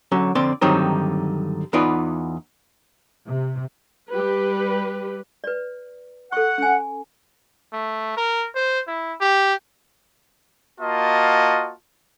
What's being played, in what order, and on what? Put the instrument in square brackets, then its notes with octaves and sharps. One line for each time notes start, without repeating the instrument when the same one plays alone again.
[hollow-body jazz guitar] D3 F#3 C#4
F2 D3 C4 D5 C6
G2 D3 D#3 F#3 C4 D#4
E2 B3 D#4 F4 B4 D5
[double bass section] C3
[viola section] G3 G4 B4
[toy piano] B4 D5
[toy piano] A4 C#6 [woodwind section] F#5
[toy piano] C#4 G#5
[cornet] A3
A#4
C5
E4
G4
[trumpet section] A#3 F4 F#4 D#5 A5